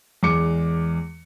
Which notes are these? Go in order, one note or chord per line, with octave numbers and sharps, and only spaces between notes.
E2 G#3 D6 C#7